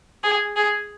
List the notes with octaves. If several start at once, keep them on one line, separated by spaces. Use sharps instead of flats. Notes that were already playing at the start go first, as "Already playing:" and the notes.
G#4
G#4